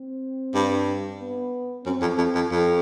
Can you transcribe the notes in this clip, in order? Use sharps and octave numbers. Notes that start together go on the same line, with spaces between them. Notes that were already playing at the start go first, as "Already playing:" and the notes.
Already playing: C4
G2
B3
F#2 C4
F2
F2
F2
F2